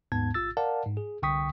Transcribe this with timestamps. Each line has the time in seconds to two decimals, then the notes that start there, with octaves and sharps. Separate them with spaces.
0.12 D#2 G#2 B3 A5 G#6
0.34 A1 F4 E6 A6
0.57 A#4 D5 F5 F#5 A5
0.85 G#2
0.97 G#4
1.22 C2 D3 G5 C#6 D#6 B6